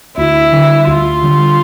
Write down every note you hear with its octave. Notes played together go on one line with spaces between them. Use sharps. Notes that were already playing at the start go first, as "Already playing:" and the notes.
D2 E4
D3 G3
D2 F4
D3 G3